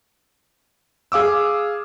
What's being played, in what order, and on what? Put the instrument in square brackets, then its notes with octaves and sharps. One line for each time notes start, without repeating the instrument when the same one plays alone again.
[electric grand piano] G#4 F5 D6 E6